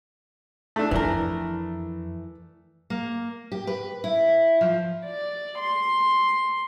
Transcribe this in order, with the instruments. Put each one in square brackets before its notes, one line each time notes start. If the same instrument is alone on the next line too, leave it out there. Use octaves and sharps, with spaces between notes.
[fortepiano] A3 D4
[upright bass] F2 [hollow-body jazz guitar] E3 A#4
[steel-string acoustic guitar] A#3
G4
B4
E4
F3
[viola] D5
C6